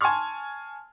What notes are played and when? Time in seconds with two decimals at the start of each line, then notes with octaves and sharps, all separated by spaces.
0.01 G#5 A5 C6 C#6 F6